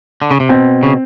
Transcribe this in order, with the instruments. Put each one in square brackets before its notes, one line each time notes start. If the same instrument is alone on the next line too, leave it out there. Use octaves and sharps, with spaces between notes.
[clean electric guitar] D3
C#3
C3
[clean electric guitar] B2 [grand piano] C4
[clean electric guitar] C#3